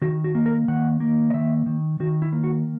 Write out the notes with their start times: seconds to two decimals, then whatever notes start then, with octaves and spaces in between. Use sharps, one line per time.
0.02 D#3 F#4
0.24 F#4
0.35 A#3
0.46 A#4
0.68 D#3 F#5
1.00 A#3
1.30 D#5
1.34 D#3 E5
1.66 D#3
2.00 D#3 F#4
2.22 E4
2.33 A#3
2.44 F#4